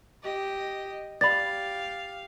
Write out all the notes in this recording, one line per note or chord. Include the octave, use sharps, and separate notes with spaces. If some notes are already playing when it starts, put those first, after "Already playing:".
G4 D#5
G4 D5 F5 B5 A6